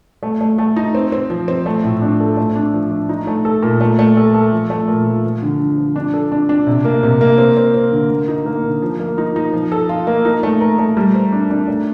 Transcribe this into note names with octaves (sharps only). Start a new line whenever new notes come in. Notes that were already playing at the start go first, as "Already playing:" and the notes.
A3
A3
A3
D#4
C4
C4
F3
C4
A3
A2
D4
A4
A3
D4
F3
D4
D#4
A3
A4
A#2
A3
A3
A4
A4
F3
A3
A#2
F3
F3
D3
D3
F3
D4
A4
D4
D4
C3
A#3
C3
A#3
C4
C4
C4
D3
A#3
D#4
A#3
D3
F3
A#3
D#4
D#4
F3
A4
F4
A#3
D#4
A3
A#4
A3
G3
C5
D4
D4
A3